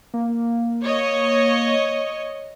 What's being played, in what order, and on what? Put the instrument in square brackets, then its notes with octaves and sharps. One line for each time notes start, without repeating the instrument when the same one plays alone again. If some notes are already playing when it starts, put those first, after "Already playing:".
[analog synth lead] A#3
[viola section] C#5 D#5